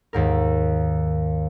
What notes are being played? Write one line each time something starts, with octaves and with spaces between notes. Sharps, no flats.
D#2 G#2 A#4